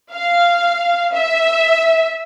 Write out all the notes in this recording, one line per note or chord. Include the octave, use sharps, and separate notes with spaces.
F5
E5